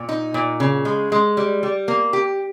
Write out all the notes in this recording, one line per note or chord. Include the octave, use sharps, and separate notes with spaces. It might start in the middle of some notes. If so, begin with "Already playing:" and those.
Already playing: A#2
D#4
A#2
C#3
G#3
G#3
G3
G3
A#3
G4